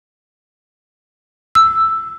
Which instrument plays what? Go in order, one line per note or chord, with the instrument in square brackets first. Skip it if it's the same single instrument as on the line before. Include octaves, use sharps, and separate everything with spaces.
[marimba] E6